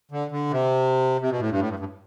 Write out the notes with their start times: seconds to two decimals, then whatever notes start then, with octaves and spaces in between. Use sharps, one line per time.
0.11 D3
0.31 D3
0.51 C3
1.21 C3
1.30 B2
1.40 A2
1.50 G2
1.59 A2
1.69 G2
1.79 G2